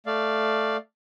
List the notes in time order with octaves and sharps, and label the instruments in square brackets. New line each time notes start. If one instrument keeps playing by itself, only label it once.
[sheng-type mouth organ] A3 D5 F5